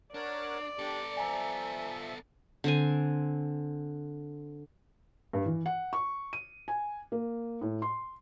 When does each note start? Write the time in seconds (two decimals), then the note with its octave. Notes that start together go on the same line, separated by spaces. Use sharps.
0.14 D4 A#4 C#5 D5 F#5
0.79 B3 D4 G4 A4
1.17 F3 E5 G#5 A#5
2.64 D3 C4 G#5
5.33 G2
5.46 E3
5.66 F#5
5.93 C#6
6.33 D#7
6.68 G#5
7.12 A#3
7.61 A2
7.82 C6